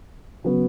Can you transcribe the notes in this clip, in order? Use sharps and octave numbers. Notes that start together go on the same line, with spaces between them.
C#3 F#3 B3 F#4